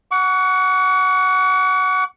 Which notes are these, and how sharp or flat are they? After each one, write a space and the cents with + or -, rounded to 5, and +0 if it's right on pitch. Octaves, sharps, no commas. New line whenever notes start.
F#5 +0 C#6 +40